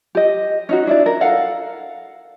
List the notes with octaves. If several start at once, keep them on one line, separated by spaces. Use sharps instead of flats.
G4 D#5
C#4 D#4 F#4
D4 E4 D5
A#4
A4 F5 F#5